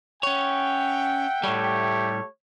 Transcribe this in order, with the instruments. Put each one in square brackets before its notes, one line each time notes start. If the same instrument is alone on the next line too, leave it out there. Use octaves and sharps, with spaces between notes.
[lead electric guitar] C#4 C#5 [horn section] E5 F#5 G5
[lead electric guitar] A2 G3 [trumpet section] A3 G4 C#5